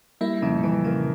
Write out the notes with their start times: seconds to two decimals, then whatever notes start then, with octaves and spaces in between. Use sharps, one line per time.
0.21 G3 A#3 E4
0.42 F2 C#3
0.58 A#2
0.63 C#3 E3
0.84 C#3 A#3